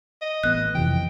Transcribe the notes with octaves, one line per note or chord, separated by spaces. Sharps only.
D#5
A1 B3 F#6
F2 C3 E3 G5